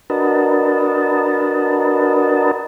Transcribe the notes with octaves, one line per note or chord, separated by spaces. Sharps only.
D4 F#4 A#4 B4 D#5 A5